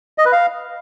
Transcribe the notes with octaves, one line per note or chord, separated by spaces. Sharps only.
D#5
B4
F5